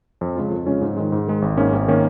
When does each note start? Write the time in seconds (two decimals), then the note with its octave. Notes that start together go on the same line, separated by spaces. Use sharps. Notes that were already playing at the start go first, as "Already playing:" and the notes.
0.21 F2
0.36 C#3 G#3 C#4 F4
0.51 F2
0.66 C#3 G#3 C#4 F4
0.81 G#2
0.97 D#3 G#3
1.12 G#2
1.27 D#3 G#3
1.42 G#1
1.57 G#2 D#3 A#3 C#4
1.73 G#1
1.88 D#3 A#3 C#4